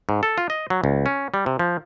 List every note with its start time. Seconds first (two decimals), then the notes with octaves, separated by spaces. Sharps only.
0.09 G#2
0.23 A4
0.38 F4
0.50 D#5
0.70 F#3
0.84 C#2
1.06 C#4
1.34 G3
1.46 C3
1.59 F3